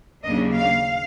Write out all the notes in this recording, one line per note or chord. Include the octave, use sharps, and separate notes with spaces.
D#2 C#3 F#3 A#3 D4 D#5
F5